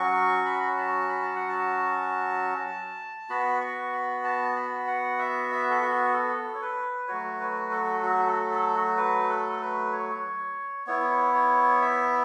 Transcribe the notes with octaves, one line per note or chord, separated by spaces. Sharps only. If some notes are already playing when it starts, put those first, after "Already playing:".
Already playing: F#3 C#4 F#4 C#6
B5
A5
B5
A5
F#5
A5
B3 F#4 B5
C#6
B5
A5
B5
F#5
E5
E5
A4
F#4
A4
C#5
B4
F#3 A3 F#4 C#5
B4
A4
F#4
A4
A4
F#4
B4
A4
B4
C#5
B3 E4 C#5
C#5
E5